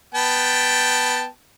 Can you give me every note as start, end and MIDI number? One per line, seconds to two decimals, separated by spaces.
0.15 1.27 59
0.15 1.27 79
0.15 1.27 81